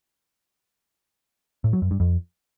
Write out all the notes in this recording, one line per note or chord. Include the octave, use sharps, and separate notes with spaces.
A2
F#3
F#2
G2
F2